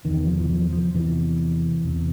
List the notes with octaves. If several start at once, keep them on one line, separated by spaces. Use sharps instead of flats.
E2 C3 D#3
F3
E3
F3
F3
E2 C3 E3
E2 C3